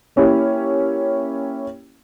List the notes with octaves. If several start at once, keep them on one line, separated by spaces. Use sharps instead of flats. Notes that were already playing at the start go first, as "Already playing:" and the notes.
A#3 C#4 E4 G4